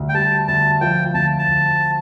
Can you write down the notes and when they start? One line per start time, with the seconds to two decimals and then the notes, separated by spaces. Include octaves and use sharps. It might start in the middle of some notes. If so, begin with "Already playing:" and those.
Already playing: D2 G3
0.09 G5
0.14 G3 A5
0.48 D2 A5
0.81 F3 G5
1.14 D2 A5
1.39 A5
1.47 D2